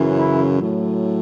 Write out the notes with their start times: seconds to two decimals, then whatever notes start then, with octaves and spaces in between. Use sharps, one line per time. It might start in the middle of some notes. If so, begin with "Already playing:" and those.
Already playing: F#2 C#3 E3
0.17 E4
0.59 A2 F#3